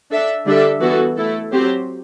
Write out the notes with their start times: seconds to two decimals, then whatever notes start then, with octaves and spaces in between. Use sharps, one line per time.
0.11 D4 A4 E5
0.46 D3 G3 D4 A4 E5
0.81 E3 B3 F#4 A4
1.16 A3 E4 A4
1.52 F#3 C4 G4 C5